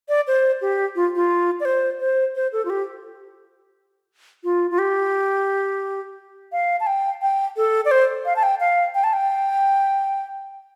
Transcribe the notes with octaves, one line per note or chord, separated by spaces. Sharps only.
D5
C5
G4
F4
F4
D5
C5
C5
C5
A4
F4
G4
F4
F4
G4
F5
A5
G5
G5
A4
D5
C5
F5
A5
G5
F5
G5
A5
G5